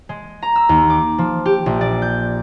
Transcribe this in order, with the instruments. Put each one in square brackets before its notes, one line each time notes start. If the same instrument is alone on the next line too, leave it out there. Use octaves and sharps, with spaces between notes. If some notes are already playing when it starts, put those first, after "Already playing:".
[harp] G#3
A#5
E6
D#2
D6
F3
G4
A#1
D5
G6